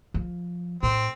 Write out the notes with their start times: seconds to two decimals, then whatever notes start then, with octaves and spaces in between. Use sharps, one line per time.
0.14 F3
0.83 A2 C4